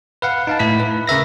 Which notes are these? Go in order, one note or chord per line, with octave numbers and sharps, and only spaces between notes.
B4 F5 F#5
D#4 F5 A5
A2 E4 B6
B4
C#3 A#4 E5 A#6